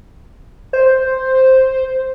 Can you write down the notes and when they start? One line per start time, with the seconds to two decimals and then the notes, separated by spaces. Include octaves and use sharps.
0.73 C5